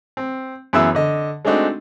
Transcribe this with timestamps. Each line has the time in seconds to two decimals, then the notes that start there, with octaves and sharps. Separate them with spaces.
0.17 C4
0.73 F#2 E3 B3 G#4 E5 E6
0.95 D3 D#5
1.45 G#3 A3 C4 D4 D#4 F#4